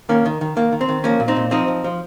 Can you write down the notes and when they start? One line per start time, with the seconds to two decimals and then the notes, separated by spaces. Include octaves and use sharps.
0.09 D#3 A#3 C#4
0.26 D#3
0.41 D#3
0.57 D#3 A#3
0.72 D#3
0.81 C4
0.89 D#3
1.04 F3 A#3 C#4
1.20 A#2
1.28 C4 D#4
1.36 A#2
1.51 F3 C4 D#4
1.68 F3
1.84 F3